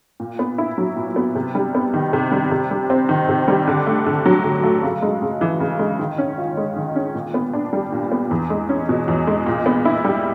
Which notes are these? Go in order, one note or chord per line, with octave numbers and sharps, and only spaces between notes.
A#2
B3
E4
F#3
A#2
B3
C3
G3
B3
D#3
C3
G3
C3
G3
C4
D#3
C3
G3
D3
A3
D3
F#3
D3
A3
C#3
G#3
C#3
E3
C#3
G#3
D#3
C#4
F4
G#3
D#3
C#4
A#2
B3
D4
G3
A#2
B3
E2
G#3
C#4
B2
E2
G#3
A#2
B3
E4
G3